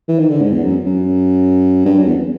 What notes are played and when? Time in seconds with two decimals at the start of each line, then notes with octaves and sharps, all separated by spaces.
0.08 E3
0.19 D#3
0.31 D3
0.42 G#2
0.52 E2
0.64 F#2
0.86 F#2
1.85 G2
1.99 F#2
2.08 E2